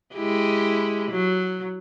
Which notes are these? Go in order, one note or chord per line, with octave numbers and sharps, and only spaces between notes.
G#3 E4 G4
F#3